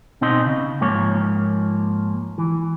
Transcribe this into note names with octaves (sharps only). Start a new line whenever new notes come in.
B2 C4 D#4 D#5 C6
C#3
G#2 F3 A#3 C#5
E3